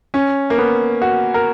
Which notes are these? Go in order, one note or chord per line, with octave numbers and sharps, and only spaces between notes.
C#4
A#3
B3
F#4
A#4